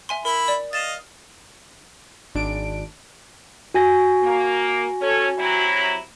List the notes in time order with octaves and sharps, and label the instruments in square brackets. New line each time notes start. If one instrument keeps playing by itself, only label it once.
[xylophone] E5 G#5 C6
[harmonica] E4 B5 [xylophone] A#4
[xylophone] D5
[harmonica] D#5 F5 [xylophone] A6 E7
[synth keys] G#1 D4 D7
[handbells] F#4 G#5 A#6
[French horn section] A#3
C#4 A4 C#5
C3 F#3 E4